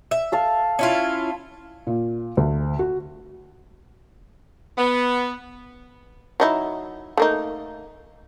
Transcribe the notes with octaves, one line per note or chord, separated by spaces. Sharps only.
E5
A4 F5 A5
C#4 E4 F4
A#2
D2
F#4
B3
F#3 D#4 E4
A3 A#3 D#4